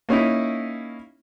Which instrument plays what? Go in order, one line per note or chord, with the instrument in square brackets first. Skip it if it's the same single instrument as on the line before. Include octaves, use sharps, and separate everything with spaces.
[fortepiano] A#3 C#4 D#4 E4